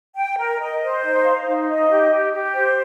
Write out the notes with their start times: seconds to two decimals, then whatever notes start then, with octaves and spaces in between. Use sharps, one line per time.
0.17 G5
0.38 A#4
0.60 D#5
0.82 C5
1.03 D#4
1.24 F5
1.47 D#4
1.68 D#5
1.89 G4
2.12 G4
2.32 G4
2.54 C5